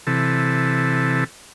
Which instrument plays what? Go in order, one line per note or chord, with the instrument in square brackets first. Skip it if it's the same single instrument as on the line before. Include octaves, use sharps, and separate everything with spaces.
[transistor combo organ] C3 E3 A4